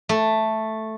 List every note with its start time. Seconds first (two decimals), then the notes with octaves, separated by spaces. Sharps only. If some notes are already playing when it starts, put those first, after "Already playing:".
0.09 A3